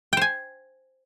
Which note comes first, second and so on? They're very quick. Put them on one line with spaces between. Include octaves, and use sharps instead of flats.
G5 C5 G#5